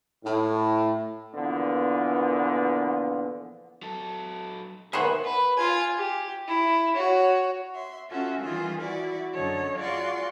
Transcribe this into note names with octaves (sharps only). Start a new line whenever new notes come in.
A2
A#2 D3 E3 F3 A#3 B3
F#3 A4
D#3 B3 G#4 C5 C#5 E5 F#5
B4
F4 G#5
G4
E4
F#4 C#5
E5 C6
C#4 F4 F#4 A4 E5
D#3 E3 G3 F4 G#4
E4 F#4 D5
F#2 D3 A4 C#5 D#5
F4 F#4 G#4 D5 C6 C#6